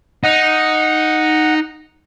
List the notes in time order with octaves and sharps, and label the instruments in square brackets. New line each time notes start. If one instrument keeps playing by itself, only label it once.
[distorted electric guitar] D#4 [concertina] F#5